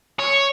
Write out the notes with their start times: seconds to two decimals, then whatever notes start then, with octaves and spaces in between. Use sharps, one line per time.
0.19 C#5